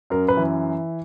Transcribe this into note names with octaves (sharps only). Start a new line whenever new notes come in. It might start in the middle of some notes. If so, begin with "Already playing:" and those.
F#2 A#4
B4
E3